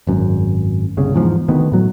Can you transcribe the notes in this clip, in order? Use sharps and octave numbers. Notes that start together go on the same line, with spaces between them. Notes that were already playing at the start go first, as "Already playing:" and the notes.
G#1 F#2
G1 C2 C#3
E2 G#2 F3
D2 D#3 B3
A2 F#3